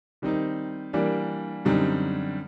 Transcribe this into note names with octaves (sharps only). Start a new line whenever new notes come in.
D#3 G3 C4 D#4
E3 G3 A#3 D4
F#2 D3 G3 C4 D#4